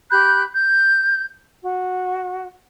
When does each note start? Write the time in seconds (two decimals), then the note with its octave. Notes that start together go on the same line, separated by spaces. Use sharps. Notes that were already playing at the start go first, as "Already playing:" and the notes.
0.11 G4 B5 F#6 G6
0.54 G6
1.63 F#4